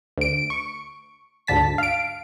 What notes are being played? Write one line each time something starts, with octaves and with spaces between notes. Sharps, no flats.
D2 D7
C#6
D2 G#2 D3 A5 B6
F5 D7